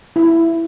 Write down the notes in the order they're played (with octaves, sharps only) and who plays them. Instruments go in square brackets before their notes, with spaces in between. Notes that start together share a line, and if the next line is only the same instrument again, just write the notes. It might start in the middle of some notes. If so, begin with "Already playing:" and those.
[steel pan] E4